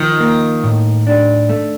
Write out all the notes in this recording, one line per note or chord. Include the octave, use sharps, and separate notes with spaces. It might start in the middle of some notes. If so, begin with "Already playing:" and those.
Already playing: D#3 F3
A#3
A2
D4
A3